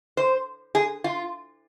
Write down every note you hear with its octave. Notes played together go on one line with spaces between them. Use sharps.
C5
G#4
F4